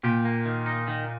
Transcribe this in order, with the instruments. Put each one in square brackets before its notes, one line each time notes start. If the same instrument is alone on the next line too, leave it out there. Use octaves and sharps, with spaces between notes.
[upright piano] A#2 [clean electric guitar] G4
[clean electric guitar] A#3
D#3
D#4
D#3